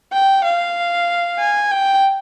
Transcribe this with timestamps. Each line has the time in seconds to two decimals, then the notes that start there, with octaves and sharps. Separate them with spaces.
0.13 G5
0.44 F5
1.39 G#5
1.71 G5